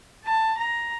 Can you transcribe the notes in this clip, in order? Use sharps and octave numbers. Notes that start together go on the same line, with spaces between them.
A5
A#5